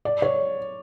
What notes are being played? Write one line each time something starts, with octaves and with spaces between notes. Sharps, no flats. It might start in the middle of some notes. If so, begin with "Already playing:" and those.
D5
C#5